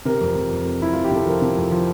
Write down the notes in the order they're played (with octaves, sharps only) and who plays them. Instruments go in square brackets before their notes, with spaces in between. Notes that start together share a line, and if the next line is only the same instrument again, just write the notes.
[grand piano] C3 A#4
F2
F2
F2
F2
F2 E4
F2 F4
G4
C3 A4
F3 A#4
C3
F2
F3